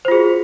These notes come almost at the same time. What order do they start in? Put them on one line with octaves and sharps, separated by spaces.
C5 F4 G#4 F#4